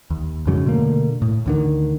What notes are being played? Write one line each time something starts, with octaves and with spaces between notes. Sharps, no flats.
D#2
F2 G#2 C#3 F#3
B2 D3 A3 A#3
A2
D2 D3 D#3